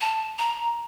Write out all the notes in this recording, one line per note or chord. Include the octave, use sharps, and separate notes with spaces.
A5
A#5